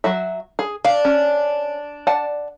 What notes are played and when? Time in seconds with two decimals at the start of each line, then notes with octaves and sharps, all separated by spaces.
0.04 F#3 F#4 E5
0.59 G#4
0.85 D4 F5
1.05 C#4
2.07 D5 F#5 A5